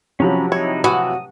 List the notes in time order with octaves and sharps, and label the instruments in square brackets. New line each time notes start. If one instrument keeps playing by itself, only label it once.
[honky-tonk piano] C3 F3 F#3 [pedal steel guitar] C#4 A#5 B5
[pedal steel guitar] D#4 E4 [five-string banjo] C#5
[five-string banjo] E3 [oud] F#4 [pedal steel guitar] D#6